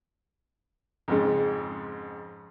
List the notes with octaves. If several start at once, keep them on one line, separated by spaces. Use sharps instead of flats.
F2 G#2 C#3